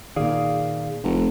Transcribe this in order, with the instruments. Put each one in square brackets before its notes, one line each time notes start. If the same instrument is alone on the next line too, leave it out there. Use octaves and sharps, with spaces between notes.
[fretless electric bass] A#2 D#3 [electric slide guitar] G#4 D5 F5
[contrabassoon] F1